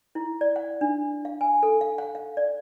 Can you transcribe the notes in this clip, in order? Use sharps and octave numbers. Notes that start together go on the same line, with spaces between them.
E4
D5
F#5
D4
F5
G#5
A4
F5
F#5
F5
D5